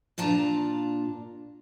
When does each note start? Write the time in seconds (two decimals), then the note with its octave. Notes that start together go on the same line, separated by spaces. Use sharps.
0.18 A#2 D4 F4 A5 A#5